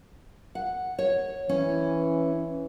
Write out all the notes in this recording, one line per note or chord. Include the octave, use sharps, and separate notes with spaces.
F#5
C#5
E3 C#4